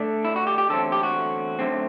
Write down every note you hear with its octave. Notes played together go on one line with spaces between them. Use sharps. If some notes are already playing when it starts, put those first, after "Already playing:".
Already playing: D2 D3 A3 D4
E4
F#4
G4
G4
E2 D3 F#3 A3 C4 A4
G4
F#4
F#2 D3 A3 C4